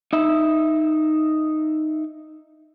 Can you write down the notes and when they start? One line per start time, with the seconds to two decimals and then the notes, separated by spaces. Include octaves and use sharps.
0.13 D#4 E5